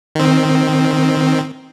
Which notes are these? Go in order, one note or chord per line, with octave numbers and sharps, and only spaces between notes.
D#3 C4